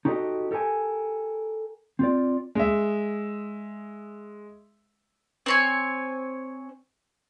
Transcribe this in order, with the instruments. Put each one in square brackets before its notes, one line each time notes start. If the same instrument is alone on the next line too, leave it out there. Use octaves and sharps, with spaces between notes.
[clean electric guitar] D#4 F#4 G4 A4 C5 D#5
G4 A4 A#4 G5 G#5
C4 F4 D5
[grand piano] G#3 E5
[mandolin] C4 C#5 G#5